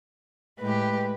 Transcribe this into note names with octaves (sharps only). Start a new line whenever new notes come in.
A2 G#3 G4 B4